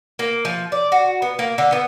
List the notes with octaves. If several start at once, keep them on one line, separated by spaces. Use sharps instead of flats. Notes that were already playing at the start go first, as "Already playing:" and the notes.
A#3
F3
D5
F#4
B3
A#3
D3
B3